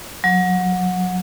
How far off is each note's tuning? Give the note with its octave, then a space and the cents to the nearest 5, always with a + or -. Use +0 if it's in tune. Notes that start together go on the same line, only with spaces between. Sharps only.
F#3 -25